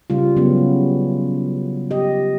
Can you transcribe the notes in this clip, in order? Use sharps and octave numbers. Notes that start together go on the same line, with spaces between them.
C#3 G3 F4
C#3 F#3 B3
G4 D#5